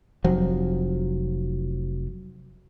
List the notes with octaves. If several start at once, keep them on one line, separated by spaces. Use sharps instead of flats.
F1 F3 F#3